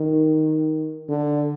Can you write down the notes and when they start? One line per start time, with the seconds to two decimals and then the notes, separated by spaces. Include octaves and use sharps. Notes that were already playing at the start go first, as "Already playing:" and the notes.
Already playing: D#3
1.09 D3